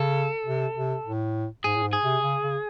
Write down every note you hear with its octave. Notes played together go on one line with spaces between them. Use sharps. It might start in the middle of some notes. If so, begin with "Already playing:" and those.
Already playing: C#3 A4
C3
C3
A2
G#2 G#4
A2
G#2
G#4
C3
C#3
C#3